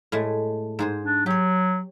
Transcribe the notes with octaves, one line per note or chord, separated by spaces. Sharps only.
A2 G#3 A3
G#2 G#4 C5
D4
F#3 G4 C#5